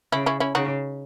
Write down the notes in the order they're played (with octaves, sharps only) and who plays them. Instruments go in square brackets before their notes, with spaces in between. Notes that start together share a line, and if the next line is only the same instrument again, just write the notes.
[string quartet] C#3 [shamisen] C#4 E4
[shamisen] C#4 E4
C#4 E4
[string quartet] C#3 [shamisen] D#4 F#4